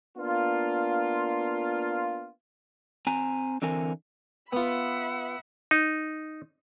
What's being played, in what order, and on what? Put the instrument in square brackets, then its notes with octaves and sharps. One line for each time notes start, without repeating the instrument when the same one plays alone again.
[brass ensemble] A#3 B3 D4 F4
[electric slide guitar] C4 G#5 A#5
D3 E3 C4 A#4 G#5
[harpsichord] B3 F4 [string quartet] E5 F#5 B5
[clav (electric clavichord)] D#4